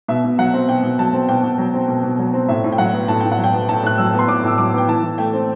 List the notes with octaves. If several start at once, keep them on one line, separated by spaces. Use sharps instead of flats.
B2 E5
B2
F#3 F#5
C4
B2 G5
B2
F#3 A5
C4
B2 G5
B2
F#3
C4
B2
B2
F#3
C4
A2 E5
A2
G5
F#3 F#5
B3
A2 A5
A2 G5
F#5
F#3
G5
B3
A2 A5
A2 F#6
F#3 E6
B3
C6
A2 D6
A2 E6
F#3 D6
B3 G5
E3 A5
E3
A3 G5
C4